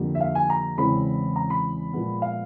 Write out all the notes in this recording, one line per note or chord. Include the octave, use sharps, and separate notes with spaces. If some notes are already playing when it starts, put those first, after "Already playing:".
Already playing: F2 D3 G3 A#3
E5
F5
G#5
A#5
E2 C#3 E3 G#3 C4 B5
A#5
B5
A#2 F3 G#3 B3
F5